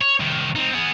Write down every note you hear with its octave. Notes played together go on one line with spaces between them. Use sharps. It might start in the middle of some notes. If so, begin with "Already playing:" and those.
C#5
C2 D#3
C4 D#4
B3 G#4